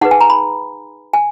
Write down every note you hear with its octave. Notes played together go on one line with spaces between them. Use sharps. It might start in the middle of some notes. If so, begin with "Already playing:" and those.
D#4 G#4 B4 F#5
G#5
A#5
B5
G#5